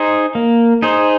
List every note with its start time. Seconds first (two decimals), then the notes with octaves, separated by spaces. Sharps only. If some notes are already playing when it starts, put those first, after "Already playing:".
Already playing: D#4 G#4 C5
0.35 A#3
0.82 D#4 G#4 C5